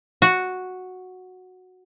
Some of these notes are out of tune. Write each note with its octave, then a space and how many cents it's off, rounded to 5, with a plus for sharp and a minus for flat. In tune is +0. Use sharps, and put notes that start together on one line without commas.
F#4 -5